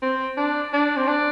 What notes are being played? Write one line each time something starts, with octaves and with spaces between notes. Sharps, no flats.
C4
D4
D4
C4
D4